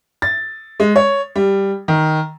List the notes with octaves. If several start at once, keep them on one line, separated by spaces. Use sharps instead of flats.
A6
G#3
C#5
G3
D#3